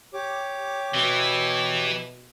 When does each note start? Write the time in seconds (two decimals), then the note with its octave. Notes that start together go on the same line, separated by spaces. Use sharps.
0.14 G4 C#5 D6
0.95 B2 E3